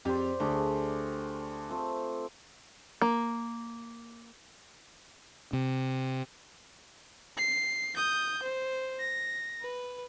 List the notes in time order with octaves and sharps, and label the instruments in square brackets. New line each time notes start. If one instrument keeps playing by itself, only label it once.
[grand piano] F2 G4 [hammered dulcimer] C5 D5
[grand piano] D2 [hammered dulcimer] A3 G4 G#4
[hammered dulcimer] A3 C4 F4
[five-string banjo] A#3
[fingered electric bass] C3
[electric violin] C7
D#6 G6
C5
A#6
B4